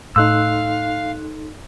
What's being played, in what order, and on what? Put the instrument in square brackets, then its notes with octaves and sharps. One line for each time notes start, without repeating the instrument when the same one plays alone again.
[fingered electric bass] A2 [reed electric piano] D#4 A4 C6 [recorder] F5 [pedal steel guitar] E6 F#6